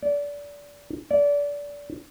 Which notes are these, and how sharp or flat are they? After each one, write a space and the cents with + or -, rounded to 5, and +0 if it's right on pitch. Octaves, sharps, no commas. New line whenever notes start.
D5 -25
D5 -25